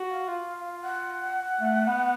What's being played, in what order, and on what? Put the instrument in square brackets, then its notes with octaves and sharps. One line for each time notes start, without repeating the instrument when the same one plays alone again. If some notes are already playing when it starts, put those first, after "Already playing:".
Already playing: [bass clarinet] F#4
[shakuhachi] F5
[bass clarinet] F4
[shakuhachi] F#5
[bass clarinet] A3
B3